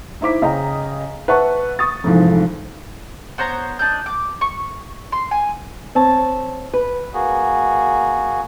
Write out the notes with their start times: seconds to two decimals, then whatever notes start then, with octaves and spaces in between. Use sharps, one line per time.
0.21 D#4 E4 C5 D6 B6
0.42 C#3 D#5 G5 A#5
1.28 B4 E5 F#5 A5 C#6
1.79 C#6 D#6 A6
2.04 F1 F2 G#2 E3 F3
3.38 B3 C5 C#5 A#5
3.79 D4 D#5 G6
4.06 D6
4.41 C#6
5.12 C6
5.31 G#5
5.95 C4 C#5 A5
6.74 B4
7.14 A#3 F#4 G#4